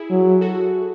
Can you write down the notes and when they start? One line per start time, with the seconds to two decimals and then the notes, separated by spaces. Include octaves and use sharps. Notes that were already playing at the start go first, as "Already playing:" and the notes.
Already playing: E4 G#4
0.10 F#3
0.41 F#4 A4